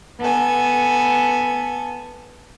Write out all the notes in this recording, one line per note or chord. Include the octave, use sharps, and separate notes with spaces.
B3 A4 G#5